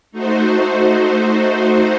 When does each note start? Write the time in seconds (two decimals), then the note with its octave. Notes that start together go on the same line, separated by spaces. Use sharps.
0.12 A3 D#4 F#4 C5